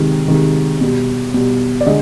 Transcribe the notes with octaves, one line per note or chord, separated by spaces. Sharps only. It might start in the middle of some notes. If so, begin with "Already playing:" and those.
Already playing: C3 D#3 G#3
C3 D#3 G#3
B2 G3
B2 G3
D5
D3 G#3 D#5